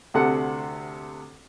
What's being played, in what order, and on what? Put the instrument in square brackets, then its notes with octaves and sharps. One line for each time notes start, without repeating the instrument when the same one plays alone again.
[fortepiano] D2 C3 A4 F#5